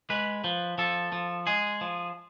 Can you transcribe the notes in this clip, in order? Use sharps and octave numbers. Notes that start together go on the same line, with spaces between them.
G#3 B4
F3
F3 A4
F3
G#3 G#4
F3